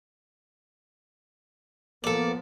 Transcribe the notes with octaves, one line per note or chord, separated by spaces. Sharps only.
F3 A#3 B3 A4 D5